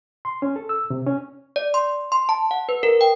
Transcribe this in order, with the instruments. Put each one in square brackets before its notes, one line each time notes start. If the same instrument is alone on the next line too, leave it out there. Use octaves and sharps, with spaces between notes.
[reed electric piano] C6
C#4
A4
E6
C3
C#4
[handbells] D5
C6
C6
A5
F#5
B4
A#4
G5